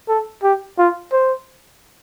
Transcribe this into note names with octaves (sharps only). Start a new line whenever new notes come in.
A4
G4
F4
C5